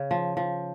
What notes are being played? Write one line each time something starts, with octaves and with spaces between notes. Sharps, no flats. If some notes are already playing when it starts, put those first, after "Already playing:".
Already playing: C#3
F3
F3